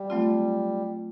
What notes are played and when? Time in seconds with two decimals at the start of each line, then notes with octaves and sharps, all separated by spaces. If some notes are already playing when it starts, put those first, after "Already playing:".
Already playing: G3
0.10 F#3 A3 C4 F4